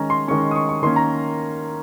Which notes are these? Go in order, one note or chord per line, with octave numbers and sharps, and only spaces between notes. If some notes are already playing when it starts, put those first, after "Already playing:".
Already playing: D#3 G#3 C#4 A#5
C6
D#3 G#3 C#4 C#6
D#6
C#6
C#6
D#3 A#3 C#4 C6
A#5